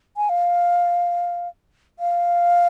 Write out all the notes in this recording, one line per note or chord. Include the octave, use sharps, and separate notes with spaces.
G#5
F5
F5